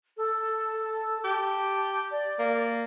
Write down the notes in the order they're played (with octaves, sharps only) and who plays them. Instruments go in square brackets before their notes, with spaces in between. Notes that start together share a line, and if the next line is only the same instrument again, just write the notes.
[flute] A4
[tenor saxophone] G4 [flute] A5
[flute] D5
[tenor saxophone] A#3